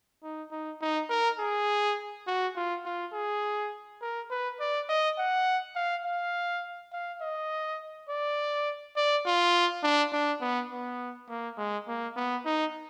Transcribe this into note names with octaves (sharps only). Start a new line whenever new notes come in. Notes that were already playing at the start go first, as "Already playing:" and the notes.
D#4
D#4
D#4
A#4
G#4
F#4
F4
F4
G#4
A#4
B4
D5
D#5
F#5
F5
F5
F5
D#5
D5
D5
F4
D4
D4
B3
B3
A#3
G#3
A#3
B3
D#4